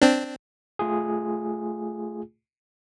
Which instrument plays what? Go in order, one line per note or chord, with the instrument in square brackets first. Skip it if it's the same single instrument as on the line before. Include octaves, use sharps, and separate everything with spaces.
[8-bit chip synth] C4 D4
[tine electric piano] A3 F4 G#4